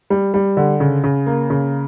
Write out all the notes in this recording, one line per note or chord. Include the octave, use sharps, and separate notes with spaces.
G3
G3
D3
C#3
C#3
A#3
C#3